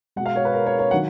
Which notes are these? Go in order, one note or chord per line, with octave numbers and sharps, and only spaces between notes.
B2 G#3 F#5
F5
C#5
B4
A#4
C#5
C#5
D#3 F#3 F#5